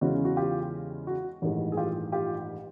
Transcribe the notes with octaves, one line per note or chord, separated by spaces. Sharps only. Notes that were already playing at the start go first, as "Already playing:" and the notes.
E2 C#3 E3 G#3 C#4 F#4
F#4
F4 G4
F#4
A1 G2 D#3 G#3
G#4
F4 G4
F4 G4